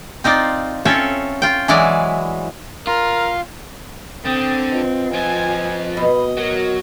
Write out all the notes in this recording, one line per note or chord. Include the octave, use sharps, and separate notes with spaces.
C4 D#4 F4 D5
C4 C#4 F4 A4 C#5 E5
F4 G5
E3 F#3 G#3 E4 D5
F4 A#4
D3 C4 G5 D#6 G6
F4 B4 D#5
F3 C4 G#5
B2 D#5 B5
F#3 F#4 A#4